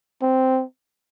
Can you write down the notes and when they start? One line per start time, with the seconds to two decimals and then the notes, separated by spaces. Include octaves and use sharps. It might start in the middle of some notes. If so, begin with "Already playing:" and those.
0.22 C4